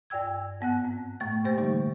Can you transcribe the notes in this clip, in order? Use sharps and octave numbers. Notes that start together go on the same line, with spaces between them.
G2 D5 G5 E6 G#6
G#2 B3 F#5 F#6
C4
A2 A3 C#6 A6
B2 A#3 G4 C5 G6 A6
D3 E3 G3 A3 D#4